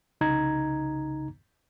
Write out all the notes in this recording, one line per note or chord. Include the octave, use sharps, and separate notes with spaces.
C2 C#3 D#4 A#5 G#6